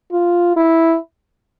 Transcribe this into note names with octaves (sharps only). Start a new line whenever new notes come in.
F4
E4